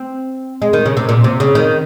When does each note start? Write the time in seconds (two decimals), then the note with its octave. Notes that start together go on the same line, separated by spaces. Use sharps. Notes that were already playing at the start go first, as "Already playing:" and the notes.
Already playing: C4
0.62 G#3
0.73 D#3
0.86 C#3
0.97 C3
1.09 A#2
1.24 C3
1.40 C#3
1.55 D#3